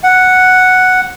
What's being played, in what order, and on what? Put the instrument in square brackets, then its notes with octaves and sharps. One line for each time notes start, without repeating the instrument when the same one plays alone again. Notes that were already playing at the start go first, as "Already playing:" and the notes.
[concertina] F#5